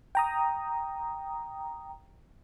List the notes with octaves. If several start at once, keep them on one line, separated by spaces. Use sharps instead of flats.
G5 A#5 D#6